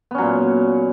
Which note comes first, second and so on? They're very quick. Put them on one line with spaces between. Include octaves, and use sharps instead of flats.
B3 C#4 F#3 A#2